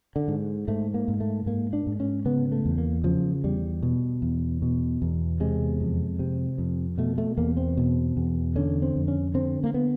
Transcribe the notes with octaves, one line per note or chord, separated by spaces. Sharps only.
D3
G#2
G#2 A3
A#3
G#2
A3
G#2 A#3
D4
G#2
C#4
C#3 B3
A3
E2
A#3
C#3 F3
E2 G3
B2
E2
B2
E2
C3 G#3
F2
C3
F2
B2 A3
A3
E2 A#3
C4
B2
E2
D3 C#4
C4
F2
C#4
D3 C4
A#3
B3